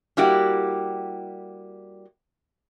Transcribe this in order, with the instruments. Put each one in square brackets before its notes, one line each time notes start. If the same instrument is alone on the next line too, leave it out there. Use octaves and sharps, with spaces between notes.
[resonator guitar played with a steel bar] G3 A#3 E4 F#4 G4